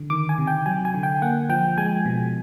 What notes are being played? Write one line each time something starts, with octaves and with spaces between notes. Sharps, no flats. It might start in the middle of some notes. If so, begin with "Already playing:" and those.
Already playing: D3
D#3 D6
G#5
C3
G5
F#3 G#5
G#5
D3
G5
A#3 F#5
F3 G5
G#3 G#5
B2